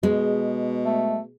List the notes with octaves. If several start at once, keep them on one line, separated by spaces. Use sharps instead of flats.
B2 G#3
A3